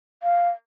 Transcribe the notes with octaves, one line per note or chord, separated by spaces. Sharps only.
F5